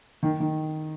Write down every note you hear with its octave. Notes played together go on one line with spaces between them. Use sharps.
D#3
D#3